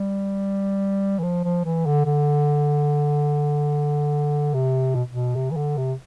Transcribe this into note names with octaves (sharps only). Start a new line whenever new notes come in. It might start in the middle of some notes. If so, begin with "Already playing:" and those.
Already playing: G3
E3
F3
F3
E3
D3
D3
C3
B2
B2
C3
E3
D3
C3